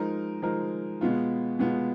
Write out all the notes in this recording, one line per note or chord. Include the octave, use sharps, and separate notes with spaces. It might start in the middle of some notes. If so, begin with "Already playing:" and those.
Already playing: F3 G#3 D#4 A#4
F3 G#3 D#4 A#4
B2 G#3 B3 F4
B2 G#3 B3 F4